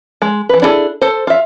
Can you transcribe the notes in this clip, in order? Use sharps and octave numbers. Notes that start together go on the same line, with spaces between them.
G#3
E3 B4
D4 E4 F4 G#4 A4
A4 C5
F4 E5